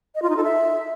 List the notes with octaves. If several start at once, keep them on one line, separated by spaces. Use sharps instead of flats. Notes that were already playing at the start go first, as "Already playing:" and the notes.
D#5
F4
D#4
A4
E5